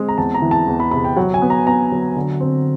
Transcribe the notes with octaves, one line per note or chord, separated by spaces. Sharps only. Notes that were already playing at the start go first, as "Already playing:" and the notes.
Already playing: G#3 C4
A#5
E2 A5
A#5
E3
A5
E2
B5
C3 B5
G5
F#3 F#5
G#5
B3
A#5
B3 A#5
F#3
D3
C4